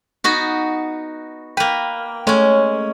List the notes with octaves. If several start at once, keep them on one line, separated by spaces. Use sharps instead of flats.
B3 D#4 F#4
A#3 B4 G5
G#3 A3 C#4 C#5